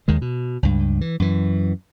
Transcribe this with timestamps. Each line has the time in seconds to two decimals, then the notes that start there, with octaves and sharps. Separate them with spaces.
0.08 D#2 D#3 G#3
0.22 B2
0.63 C#2 G2
1.01 E3
1.20 F#2 E3